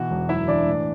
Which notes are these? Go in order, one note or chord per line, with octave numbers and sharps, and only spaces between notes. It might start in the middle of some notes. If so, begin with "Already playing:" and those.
Already playing: B2 E3 F#4
E1
F#2 E4 E5
E3 D4 D5
A2